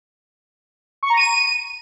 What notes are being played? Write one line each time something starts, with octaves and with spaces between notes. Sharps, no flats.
C#6
A#5
D#7